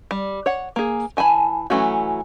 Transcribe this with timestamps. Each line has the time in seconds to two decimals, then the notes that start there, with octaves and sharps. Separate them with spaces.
0.11 G3
0.46 C#5 F#5
0.76 A#3 G#4
1.17 E3 G#5 A5 B5
1.70 E3 F#3 A3 C#4 F#4